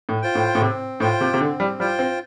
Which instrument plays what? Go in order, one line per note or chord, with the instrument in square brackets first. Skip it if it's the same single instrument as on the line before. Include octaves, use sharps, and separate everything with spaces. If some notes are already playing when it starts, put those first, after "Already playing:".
[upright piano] A2
[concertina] F4 C5 G5
[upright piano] A2
A2
[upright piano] C3 [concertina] C4
[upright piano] A2 [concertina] F4 C5 G5
[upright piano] C3
C3
[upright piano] D3 [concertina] C4
[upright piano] G3
[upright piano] G3 [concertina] F4 C5 G5
[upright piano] C4